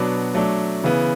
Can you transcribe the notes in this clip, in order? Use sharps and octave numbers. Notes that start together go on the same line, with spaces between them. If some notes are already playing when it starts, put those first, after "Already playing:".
Already playing: B2 F#3 B3 D4
F#3 A3 D4
C#3 E3 B3